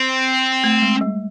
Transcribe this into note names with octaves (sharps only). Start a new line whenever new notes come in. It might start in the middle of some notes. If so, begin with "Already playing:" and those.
Already playing: C4
A3
G#3
G3